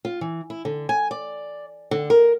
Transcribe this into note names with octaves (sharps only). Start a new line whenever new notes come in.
F4
E3
E4
D3
G#5
D5
D3
A#4